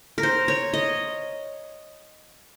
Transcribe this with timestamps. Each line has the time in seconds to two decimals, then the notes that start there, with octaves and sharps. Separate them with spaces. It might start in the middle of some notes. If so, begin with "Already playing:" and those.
0.18 A#4
0.23 C5
0.48 C#5
0.73 D#5